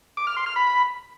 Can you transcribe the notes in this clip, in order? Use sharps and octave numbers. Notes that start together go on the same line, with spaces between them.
D6
F6
C6
F6
B5